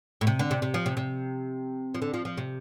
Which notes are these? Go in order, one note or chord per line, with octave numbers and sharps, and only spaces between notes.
A2
C3
D3
C3
C3
F3
C3
C3
F3
D3
F3
F3
C3